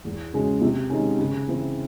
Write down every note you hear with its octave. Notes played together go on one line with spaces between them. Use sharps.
E2
C#3 G#3 C#4 F#4
C3
D#3 G#3 C#4
C#3
E3 C4 E4